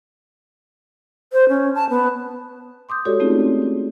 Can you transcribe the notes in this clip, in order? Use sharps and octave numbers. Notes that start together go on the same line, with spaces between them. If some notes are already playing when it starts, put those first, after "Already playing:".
C5
C#4
A5
B3
C6 D6 D#6 G6
G#3 F#4 G4 A4 C#5 D5
A3 C4 C#4 D#4 F4 G#4
D4